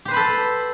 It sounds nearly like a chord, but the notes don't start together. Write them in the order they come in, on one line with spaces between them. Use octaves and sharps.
G4 C5 B4 B5 A4